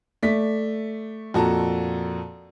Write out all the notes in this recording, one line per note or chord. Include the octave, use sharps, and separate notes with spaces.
A3 D5 B6
F2 A#2 F#4 A4 A5 A#5